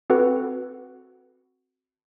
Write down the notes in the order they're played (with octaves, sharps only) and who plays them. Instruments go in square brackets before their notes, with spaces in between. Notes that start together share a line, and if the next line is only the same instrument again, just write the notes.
[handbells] C4 F#4 A4 B4 F#5